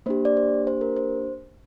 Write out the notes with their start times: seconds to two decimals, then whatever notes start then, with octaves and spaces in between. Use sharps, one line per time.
0.06 A#3 D4 G4 C5
0.25 D5
0.37 C5
0.67 C5
0.81 A#4
0.97 C5